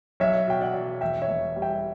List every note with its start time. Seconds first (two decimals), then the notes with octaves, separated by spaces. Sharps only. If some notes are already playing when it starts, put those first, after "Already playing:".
0.20 B1 C#5 E5
0.47 B2 G5
0.61 D5 F#5
0.74 B2
1.01 E1 E5 G5
1.22 C#5 E5
1.28 E1
1.56 G3
1.62 E5 G5